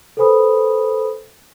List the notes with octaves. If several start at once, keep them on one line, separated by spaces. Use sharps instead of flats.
A4 B4 C5 G#5 B5 D#6